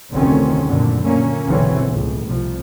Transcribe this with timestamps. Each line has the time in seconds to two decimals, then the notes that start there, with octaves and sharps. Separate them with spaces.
0.12 F1 D2 D3 D#3 C4 C#4
0.66 F#2 A#2 D3
1.04 A#2 D3 A#3 C#4
1.46 F#1 B1 D3 E3 C4 C#4
1.88 C#2 A2
2.28 C2 F3